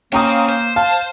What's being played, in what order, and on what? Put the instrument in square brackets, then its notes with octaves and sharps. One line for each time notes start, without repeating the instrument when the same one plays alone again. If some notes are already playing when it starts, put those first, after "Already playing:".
[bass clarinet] A#3 [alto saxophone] C#4 [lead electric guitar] C5 G5 [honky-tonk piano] F5 A#5 D#6
[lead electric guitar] C5
[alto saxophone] F5 [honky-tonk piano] A5